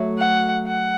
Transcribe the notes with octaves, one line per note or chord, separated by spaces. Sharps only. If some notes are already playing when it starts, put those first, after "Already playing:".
Already playing: F#3 A3
F#5
F#5